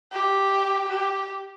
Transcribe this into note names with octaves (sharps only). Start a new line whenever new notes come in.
G4
G4